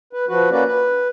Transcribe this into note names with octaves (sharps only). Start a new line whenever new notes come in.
B4
F3 F#4 B4
A#3 C#4 F#4 B4 D5
B4